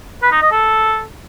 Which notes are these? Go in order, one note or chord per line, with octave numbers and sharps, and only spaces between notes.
B4
D#4
D#5
A4